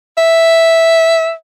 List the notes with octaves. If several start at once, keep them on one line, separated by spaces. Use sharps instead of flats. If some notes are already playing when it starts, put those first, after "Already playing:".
E5